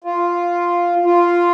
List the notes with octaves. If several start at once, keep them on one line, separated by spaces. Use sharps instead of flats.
F4
F4